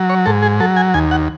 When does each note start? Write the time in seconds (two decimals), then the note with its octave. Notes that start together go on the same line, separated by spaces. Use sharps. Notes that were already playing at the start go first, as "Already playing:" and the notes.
Already playing: F#3
0.10 C#5
0.26 G#2 A4
0.42 G#4
0.60 F#3 A4
0.76 G#5
0.94 D#2 G#5
1.11 F#5